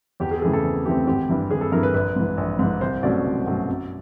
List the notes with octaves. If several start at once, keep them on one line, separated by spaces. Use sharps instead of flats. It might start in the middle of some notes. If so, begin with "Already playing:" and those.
E2 G4
G#4
A4
C#3 E3 A3 C4 G#4
A4
E2
C#3 E3 A3 C4 G4
G#1 G4
G2 E3
G#1 G#4
A4
G2 E3 A#4
B4
A#1 B4
G#2 E3
A#1
G#2 E3
C2 C5
B2 F#3 A3 C#4 D5
C2
B2 F#3 A3 C#4
F#2